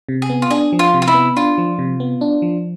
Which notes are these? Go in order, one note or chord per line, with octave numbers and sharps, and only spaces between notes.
C3
G#4
B3
F4
D4 G#4
F3
F4
C3
F4
E4
B3
D4 F4
F3
C3
B3
D4
F3